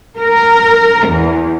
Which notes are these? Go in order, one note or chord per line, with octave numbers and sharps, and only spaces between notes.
A#4
E2